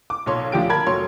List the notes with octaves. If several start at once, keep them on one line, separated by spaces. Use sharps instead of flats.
D6
B1 A#2 C#5 C6
D2 F3 D4 G4 D7
A#4 A5 B5 G#6
F1 F#3 C#5 C6